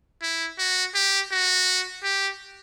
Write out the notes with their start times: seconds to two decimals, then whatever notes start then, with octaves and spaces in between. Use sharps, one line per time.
0.22 E4
0.59 F#4
0.95 G4
1.32 F#4
2.04 G4